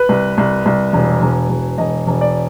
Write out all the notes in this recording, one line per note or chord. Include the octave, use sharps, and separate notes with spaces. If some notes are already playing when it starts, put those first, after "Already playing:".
Already playing: B4
C2
C2
C2
E1
E1
E1
E1 D#5
E1
D5